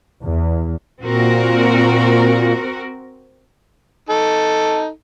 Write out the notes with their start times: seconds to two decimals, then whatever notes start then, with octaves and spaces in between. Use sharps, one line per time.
0.23 E2
1.01 A#2 C4 F#4 A#4
4.09 D#4 A4